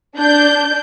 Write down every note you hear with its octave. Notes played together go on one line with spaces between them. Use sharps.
D4 G6